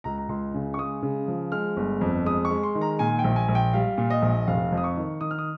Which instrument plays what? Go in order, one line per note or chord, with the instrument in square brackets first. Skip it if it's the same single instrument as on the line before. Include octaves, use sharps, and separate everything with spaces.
[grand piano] C#2 A#5
A#5
C#2 C6
C#3
C#6
G#3 D#6
C#3
F3
G#3 F6
G1
F2
G#3 D#6
C#6
G#3
C6
D#3
A#5
A#2 G#5
G5
A#1
G#5
A#1
G5
G3 F5
A#2
D#5
A#1
F1 F5
F2
D#6
C#6
D#3
D#3 D#6
F6
D#6